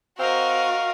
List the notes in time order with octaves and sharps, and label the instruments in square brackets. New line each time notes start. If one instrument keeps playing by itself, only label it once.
[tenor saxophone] C4 [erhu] F#4 [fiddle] A#4 D#5 [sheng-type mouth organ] F5